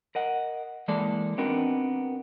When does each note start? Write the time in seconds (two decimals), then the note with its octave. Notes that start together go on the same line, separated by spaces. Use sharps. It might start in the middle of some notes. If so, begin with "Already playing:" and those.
0.15 A#4 D#5 F#5
0.88 E3 G#3 A#3 A4 D5
1.38 B3 C4 D4 D#4 F#4 A#4